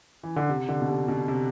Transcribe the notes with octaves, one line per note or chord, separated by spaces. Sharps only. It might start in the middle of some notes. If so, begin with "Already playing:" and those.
E3
D3
C3
D3
B2
C3
B2
C3